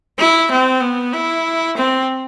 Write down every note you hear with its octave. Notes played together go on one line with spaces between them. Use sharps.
E4
C4
B3
E4
C4